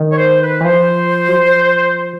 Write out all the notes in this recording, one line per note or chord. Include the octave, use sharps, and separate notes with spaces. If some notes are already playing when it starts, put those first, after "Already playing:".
Already playing: D#3
C#5
C5
B4
E3
F3 C5
F#3
F3